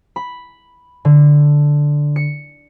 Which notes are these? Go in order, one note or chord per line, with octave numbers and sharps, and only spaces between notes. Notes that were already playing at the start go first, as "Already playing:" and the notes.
B5
D3
C#7